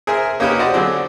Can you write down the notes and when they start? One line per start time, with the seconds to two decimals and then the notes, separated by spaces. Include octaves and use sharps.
0.07 G#4 A#4 C5 E5 G#5
0.40 A#3 C#4 D#4 G4 A#4 B4
0.59 F#4 G4 C5 D5 D#5
0.73 D3 F#3 C4 D4 G#4